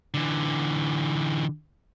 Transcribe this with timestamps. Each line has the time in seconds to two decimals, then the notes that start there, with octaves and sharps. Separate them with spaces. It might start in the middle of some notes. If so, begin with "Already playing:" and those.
0.14 D3 E3